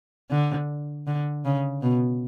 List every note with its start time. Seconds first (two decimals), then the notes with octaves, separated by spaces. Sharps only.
0.31 D3
1.07 D3
1.45 C#3
1.82 B2